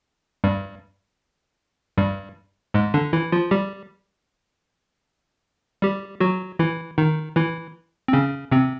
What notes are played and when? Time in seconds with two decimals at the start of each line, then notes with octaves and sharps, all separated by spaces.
0.44 G2 G3
1.98 G2 G3
2.74 G#2 G#3
2.94 D3 D4
3.13 E3 E4
3.32 F3 F4
3.51 G3 G4
5.82 G3 G4
6.20 F#3 F#4
6.59 E3 E4
6.98 D#3 D#4
7.36 E3 E4
8.08 C4
8.13 C#3 C#4
8.52 C3 C4